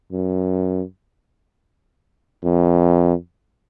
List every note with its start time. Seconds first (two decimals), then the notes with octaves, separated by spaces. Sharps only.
0.12 F#2
2.44 F2